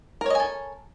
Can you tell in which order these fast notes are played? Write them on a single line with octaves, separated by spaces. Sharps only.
A#4 C#5 D#5 G#5 A4